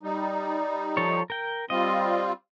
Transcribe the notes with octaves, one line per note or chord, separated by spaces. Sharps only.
G3 D#4
F3 A4 C#5
A#4 G5
G3 C4 F4 D#5